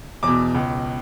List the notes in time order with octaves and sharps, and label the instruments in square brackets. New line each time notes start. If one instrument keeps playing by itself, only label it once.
[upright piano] E2 B2 D6
C#2 B2